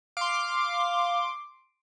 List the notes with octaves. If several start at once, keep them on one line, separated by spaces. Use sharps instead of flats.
F5 C6 D6